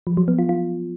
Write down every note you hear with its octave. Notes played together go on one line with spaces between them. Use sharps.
F3
F#3
B3
F4
F4